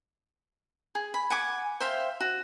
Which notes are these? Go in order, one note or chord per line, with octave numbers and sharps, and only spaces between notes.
G#4
B5
F#5 G#5 D6
C5 E5 F5 G5
F#4